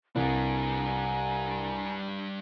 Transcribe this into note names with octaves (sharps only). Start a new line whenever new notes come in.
C2 G3 D4 G#5 A#5